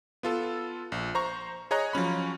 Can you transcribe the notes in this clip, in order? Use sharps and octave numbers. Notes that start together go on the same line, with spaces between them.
B3 F4 A4
A#1
C5 A#5 C#6
G#4 C#5 D#5 A#5 F#6
F3 F#3 C#4 B5